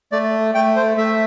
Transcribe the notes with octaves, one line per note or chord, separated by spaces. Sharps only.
A3 D5
A3 G5
C5
A3 E5